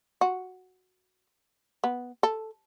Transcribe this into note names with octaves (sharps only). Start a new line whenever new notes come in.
F#4
B3
A4